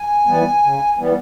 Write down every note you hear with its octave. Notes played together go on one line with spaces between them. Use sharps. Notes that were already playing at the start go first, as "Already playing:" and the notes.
Already playing: G#5
E3 G3 B3
C#3
E3 G3 B3